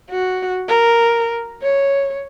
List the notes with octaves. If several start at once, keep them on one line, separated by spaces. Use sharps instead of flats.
F#4
A#4
C#5